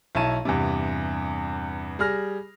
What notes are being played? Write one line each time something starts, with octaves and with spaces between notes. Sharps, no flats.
B1 E4 C#5 A5 D#7
E2 G2 C3
G3 G#4 F6 A#6